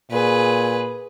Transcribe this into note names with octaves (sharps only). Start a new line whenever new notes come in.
A#2 G#4 B4